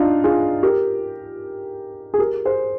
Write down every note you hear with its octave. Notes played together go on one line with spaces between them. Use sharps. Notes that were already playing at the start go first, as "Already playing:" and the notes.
Already playing: D4 D#4 F4
F4 G#4
G4 A#4
G#4
G4 A#4
G#4 C5